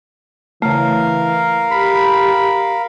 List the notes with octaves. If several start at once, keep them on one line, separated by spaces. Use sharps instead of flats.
C#3 E3 A3 A#4 F5
G4 B5